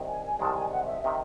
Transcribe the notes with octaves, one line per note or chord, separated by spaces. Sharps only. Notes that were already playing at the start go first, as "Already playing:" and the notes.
Already playing: C2 C3 D#3
G#5
G#5
C2 C3 D#3 G#3 A5
G#5
F#5
E5
C3 D#3 E5